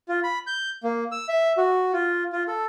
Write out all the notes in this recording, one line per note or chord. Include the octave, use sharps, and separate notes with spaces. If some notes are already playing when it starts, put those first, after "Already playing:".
F4
B5
G6
A#3
E6
E5
F#4
F4
F4
A4